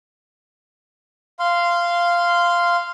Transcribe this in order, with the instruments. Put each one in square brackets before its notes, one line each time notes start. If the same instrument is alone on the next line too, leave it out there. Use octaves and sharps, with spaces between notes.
[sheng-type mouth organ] F5 C6